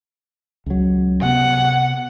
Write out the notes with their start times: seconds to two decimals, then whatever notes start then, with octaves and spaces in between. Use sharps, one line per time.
0.66 C#2 F#3
1.22 C3 B3 F#5